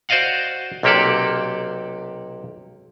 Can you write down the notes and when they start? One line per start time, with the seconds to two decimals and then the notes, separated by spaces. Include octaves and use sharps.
0.09 F#4 C5 D5 D#5 F5 F#5
0.83 B1 C3 A#3 G4 A4 D5